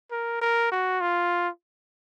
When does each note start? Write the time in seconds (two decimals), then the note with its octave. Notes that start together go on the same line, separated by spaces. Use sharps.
0.11 A#4
0.41 A#4
0.72 F#4
1.01 F4